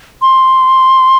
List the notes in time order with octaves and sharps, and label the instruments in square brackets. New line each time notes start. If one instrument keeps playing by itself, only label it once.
[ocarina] C6